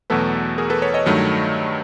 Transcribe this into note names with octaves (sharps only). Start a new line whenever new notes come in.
E2 B2 F#3 A3 A4 B4
G#4 A#4
A4 B4
B4 C#5
C#5 D#5
G2 D#3 F#3 A3